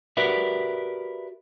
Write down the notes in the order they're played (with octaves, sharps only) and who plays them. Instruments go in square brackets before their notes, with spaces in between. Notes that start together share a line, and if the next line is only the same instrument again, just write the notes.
[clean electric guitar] F#4 G4 A#4 B4 D5 E5